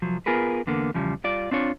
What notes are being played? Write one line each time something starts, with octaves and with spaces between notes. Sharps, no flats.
C2 F3 F#3
B3 F4 G#4 A#4 B4
E2 D3 A#3 B3
E2 C#3 F3 G3
G3 F4 D5
C4 D4 F4 C#5